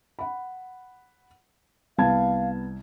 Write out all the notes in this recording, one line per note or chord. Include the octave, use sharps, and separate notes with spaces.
F#5 B5
C2 B3 F5 A5 G#6